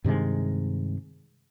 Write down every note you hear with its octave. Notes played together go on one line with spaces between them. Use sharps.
G2 C3 D#3 G#3